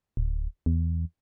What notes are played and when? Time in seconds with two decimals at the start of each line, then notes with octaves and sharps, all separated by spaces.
0.17 D1
0.66 E2